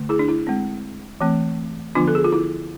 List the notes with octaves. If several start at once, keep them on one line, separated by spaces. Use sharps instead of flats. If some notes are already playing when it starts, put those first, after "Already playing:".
Already playing: D3 A3
E4 G#4
D4
E4
G#3 C4
E3 A3 C4
D3 F3 B3 D4 F4
A4
G#4
F4
E4